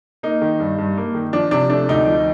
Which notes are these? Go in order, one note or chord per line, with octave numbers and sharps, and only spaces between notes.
A#3 D#4
D#3
G2
G2
A#3
D#3
F3 D4
C3 D4
A3 D4
D2 D#4
F3